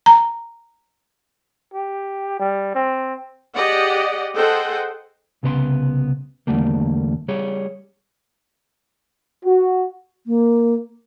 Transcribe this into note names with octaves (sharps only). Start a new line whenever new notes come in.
A#5
G4
G3
C4
G4 G#4 D5 D#5 F#5
G#4 A4 C5 D#5 F#5 G5
C2 C#3 B3 C5 C6
E2 D3 G3 A3 A#3
G3 G#4 C#5
F#4
A#3